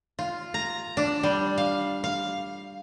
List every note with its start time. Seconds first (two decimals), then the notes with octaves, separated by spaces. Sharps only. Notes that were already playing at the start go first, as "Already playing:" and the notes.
0.19 F4
0.54 A#5
0.97 D4
1.23 G3
1.58 F5
2.04 F5